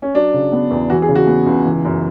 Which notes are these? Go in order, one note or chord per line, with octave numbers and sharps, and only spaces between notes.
C#4
F#3 D4
C#3
B3
E2
E3 F#4
G#4
C#3
F#4
B3
C#2
E3
F#2